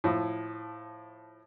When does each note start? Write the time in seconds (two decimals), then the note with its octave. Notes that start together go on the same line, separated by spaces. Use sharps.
0.04 A2 F3